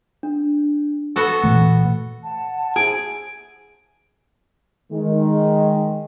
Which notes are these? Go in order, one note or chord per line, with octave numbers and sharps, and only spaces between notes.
D4
B3 F#4 A4
A#2 E3 A3
F#5 A5
E4 G#4 C5 D7
D#3 G#3